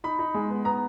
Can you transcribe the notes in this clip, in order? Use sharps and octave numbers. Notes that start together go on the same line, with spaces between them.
D#4 B5
D#4
G#3
B3
B3 A#5